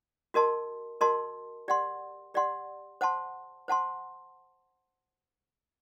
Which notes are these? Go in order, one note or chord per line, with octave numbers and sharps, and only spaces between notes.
F#4 A#4 D#5 A5 C6
F#4 A#4 D#5 A5 C6
G4 D5 F#5 C6
G4 D5 F#5 C6
C5 F#5 A5 C6
C5 F#5 A5 C6